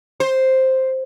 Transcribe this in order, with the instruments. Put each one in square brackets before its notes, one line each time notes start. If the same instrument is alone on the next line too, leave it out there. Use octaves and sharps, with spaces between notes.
[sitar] C5